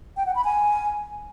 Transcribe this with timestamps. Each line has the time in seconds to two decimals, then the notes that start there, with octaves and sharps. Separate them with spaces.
0.17 G5
0.26 F#5
0.35 B5
0.45 G#5